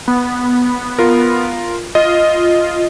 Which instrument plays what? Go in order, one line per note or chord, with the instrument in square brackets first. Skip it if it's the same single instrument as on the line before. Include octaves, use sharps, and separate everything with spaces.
[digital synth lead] B3
[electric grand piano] F4 A#4
[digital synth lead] F4 [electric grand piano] D#5